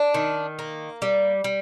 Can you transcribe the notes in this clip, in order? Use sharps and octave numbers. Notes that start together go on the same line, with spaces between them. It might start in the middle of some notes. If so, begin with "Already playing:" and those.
Already playing: D4
D#3
A#3
G3
G3